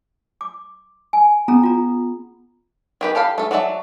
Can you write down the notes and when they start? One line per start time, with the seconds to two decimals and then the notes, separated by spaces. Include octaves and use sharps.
0.41 D6
1.13 G#5
1.48 B3 C#4 G#4 A#5
1.63 F4 A#5
3.01 D#3 G4 B4
3.15 G4 A4 F5 B5
3.38 A3 A4
3.51 F#3 F#4 D5 E5 A5